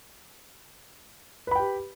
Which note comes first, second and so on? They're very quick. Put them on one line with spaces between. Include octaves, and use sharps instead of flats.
B4 B5 G5 G4